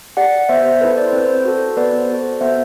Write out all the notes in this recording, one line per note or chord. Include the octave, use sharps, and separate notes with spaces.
G4 D5 F#5
B3 C5 E5
C5
E4 A4 B4
D5
C5
C4 B4
C5
F#4 A4
B3 B4 D5
C5
F#4 A4
C5
B3 C5 E5